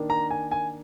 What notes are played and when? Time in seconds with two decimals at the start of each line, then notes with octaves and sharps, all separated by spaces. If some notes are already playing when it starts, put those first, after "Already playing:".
Already playing: D#3 A#3 D4
0.10 A#5
0.30 G#5
0.51 G#5